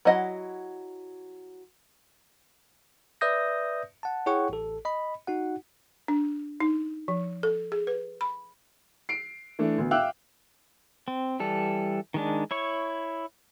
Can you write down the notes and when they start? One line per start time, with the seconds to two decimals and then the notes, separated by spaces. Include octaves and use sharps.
0.05 F#3 E4 D#5 F#5
3.21 B4 D5 E5 D#6 G6 A#6
4.03 F#5 A5
4.26 E4 G#4 C#5 F#5 G5 C#6
4.50 A1 A4
4.85 D#5 B5
5.27 D#4 F#4 F#5
6.08 D4
6.60 D#4
7.08 F3
7.43 A4
7.72 G#4
7.87 B4
8.21 B5
9.09 C7 D7
9.59 E3 A3 D4
9.78 D2 B3
9.91 E5 F5 G5 D6 E6 F#6
11.08 C4
11.40 E3 G3 A4
12.14 D#3 G#3 D4
12.51 E4 C#5 C#6